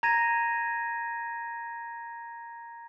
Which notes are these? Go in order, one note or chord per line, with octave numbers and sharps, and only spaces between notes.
A#5 G#6 A#6 D#7